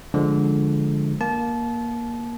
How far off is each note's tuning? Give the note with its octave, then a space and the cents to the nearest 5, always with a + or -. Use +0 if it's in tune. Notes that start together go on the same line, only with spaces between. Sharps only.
D3 +0 F3 +0 G#3 +5
A#3 +15 A5 -25